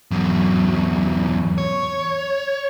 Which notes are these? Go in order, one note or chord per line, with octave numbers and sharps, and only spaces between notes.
E2 F#3
C#5